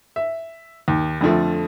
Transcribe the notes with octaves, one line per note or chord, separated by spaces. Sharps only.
E5
D#2
F2 D3 F3 A3